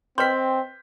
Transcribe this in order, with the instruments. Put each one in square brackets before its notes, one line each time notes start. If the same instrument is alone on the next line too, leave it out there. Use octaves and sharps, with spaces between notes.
[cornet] C4 [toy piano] B4 C6 [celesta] D#5 G5 [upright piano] G6 B6